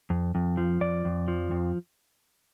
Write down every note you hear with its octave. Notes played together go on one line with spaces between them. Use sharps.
F2
F2
F3
F2 D5
F2
F3
F2